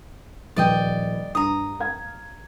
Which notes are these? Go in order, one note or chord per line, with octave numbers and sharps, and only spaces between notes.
D#1 F3 B4 D5 D#5 G5
G2 A#5 D#6
F5 G#6